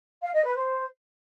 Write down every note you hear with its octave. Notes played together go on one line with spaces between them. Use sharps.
F5
D#5
B4
C5